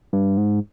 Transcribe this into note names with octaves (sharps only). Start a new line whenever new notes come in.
G2
G#2